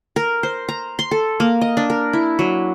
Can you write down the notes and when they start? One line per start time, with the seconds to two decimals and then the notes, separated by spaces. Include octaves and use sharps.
0.16 A#4
0.43 C5
0.68 A#5
0.99 C6
1.11 A4
1.40 A#3
1.61 D#5
1.77 D4
1.90 A#4
2.13 E4
2.39 F#3